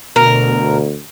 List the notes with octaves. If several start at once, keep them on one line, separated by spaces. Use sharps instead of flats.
D2 B2 A#4